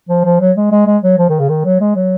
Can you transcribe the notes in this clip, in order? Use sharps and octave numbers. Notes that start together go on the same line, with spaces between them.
F3
F3
F#3
G#3
G#3
G#3
F#3
F3
D#3
C#3
D#3
F#3
G#3
F#3